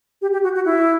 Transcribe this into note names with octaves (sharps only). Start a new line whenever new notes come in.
G4
G4
F#4
F#4
E4